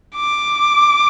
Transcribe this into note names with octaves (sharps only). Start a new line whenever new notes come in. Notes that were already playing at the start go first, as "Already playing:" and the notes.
D6